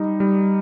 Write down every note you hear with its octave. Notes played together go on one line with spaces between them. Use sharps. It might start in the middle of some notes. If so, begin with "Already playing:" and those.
Already playing: G3 D#4
G3